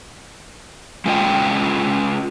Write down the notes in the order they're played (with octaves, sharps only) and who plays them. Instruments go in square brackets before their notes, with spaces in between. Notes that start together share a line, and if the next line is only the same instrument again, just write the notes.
[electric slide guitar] G#3 C#4 F4 D5 D#5 G5